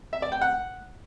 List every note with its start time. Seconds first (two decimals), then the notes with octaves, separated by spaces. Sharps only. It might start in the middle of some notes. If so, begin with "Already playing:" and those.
0.13 E5
0.22 D5
0.32 G5
0.41 F#5